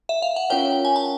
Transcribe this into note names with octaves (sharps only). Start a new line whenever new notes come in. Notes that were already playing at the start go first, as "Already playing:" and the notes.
E5
F5
F#5
C#4 F4 A#4 C#5 F5 G5
G#5
A5